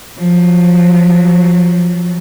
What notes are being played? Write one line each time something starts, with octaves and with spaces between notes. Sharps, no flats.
F3 F#3